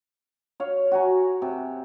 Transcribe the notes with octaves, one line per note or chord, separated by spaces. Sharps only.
C#5 F5
F#4 G#5 A#5
C3